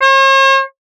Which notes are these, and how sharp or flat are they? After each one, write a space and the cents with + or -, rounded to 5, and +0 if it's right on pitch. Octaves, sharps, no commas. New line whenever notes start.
C#5 -45